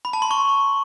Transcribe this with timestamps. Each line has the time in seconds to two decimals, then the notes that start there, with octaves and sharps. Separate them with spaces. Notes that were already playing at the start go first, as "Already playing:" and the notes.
0.05 B5
0.13 A5
0.22 C6
0.31 C#6